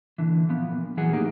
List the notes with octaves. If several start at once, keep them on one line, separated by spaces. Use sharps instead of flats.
A#2 D3 E3
F3 B3
A#2
E2 E3 F#3 B3 G#4 F#5
A2 E3 A#3 D#4 G4